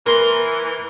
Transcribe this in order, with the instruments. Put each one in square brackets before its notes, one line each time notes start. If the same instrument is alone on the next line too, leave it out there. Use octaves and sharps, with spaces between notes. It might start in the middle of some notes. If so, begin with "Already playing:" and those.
[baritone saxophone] E3 [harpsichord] A#4 C6